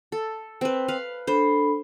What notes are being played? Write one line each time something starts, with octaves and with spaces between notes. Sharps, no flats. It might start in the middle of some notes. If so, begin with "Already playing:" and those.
A4
C4 B4
B4 F5
D4 A4 C5 B5